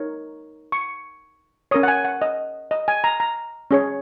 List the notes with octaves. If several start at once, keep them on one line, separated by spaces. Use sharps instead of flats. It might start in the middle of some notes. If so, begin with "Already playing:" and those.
Already playing: D#4 A#4 C#5
C#6
C#4 A#4 C#5 D#6
F#5
G#5
F#5
D#5
D#5
G#5
A#5
A#5
C#4 G#4 C#5